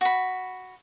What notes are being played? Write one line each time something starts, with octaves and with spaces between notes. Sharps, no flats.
F#4 B5